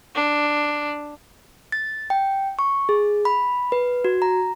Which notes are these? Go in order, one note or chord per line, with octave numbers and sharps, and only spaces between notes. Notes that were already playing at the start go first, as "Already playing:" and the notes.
D4
A6
G5
C#6
G#4
B5
B4
F#4
A#5